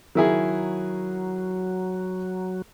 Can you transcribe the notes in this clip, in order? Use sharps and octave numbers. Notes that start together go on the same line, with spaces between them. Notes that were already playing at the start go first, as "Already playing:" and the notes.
D#3 F#3 E4 G#4